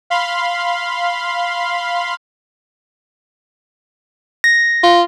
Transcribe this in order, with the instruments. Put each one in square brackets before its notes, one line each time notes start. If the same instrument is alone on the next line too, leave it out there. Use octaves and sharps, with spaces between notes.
[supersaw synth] F5 B5 C6
[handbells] A#6
[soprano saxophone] F4